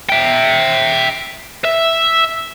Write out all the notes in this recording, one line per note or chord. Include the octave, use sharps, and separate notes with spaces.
E5 G5
E5